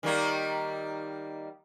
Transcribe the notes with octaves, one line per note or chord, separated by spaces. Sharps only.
D#3 G3 A#3